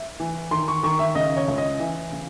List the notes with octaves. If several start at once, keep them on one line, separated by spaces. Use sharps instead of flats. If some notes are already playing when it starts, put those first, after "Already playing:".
Already playing: E5
E3
D#3 C6
C#6
D#3 C#6
E5
C#3 D#5
C#5
C#2
D#5
E3 E5
C#3